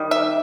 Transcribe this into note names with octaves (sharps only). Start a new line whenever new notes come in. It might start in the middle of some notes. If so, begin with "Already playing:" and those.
Already playing: D#3 G3
E5